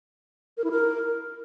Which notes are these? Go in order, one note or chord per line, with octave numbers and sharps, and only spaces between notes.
A#4
E4
A#4